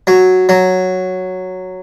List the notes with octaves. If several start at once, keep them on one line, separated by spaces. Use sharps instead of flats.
F#3
F#3